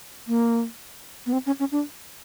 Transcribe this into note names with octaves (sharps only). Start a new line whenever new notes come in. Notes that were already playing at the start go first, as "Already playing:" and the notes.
A#3
B3
C4
C#4
C#4
D4